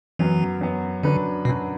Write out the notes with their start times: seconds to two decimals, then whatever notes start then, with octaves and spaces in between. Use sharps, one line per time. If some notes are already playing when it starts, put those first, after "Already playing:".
0.19 F#2 E3 F#3 B3
0.61 F#2 F#3 B3
1.03 F#2 D3 F#3 D4 B4
1.45 F#2 B2 F#3 D4 B4